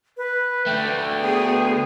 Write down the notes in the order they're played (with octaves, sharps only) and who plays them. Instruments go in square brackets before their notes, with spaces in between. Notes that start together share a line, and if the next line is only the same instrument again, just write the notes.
[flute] B4
[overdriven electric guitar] D3 A3 [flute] G5
[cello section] B3 G#4